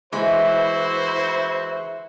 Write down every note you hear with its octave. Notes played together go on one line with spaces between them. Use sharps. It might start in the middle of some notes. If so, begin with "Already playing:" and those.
E3 G#3 E4 F#4 C5